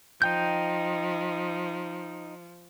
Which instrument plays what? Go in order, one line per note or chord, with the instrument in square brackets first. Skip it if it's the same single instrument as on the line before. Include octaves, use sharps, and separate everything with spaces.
[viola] F3 [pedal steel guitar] D#4 G5 G6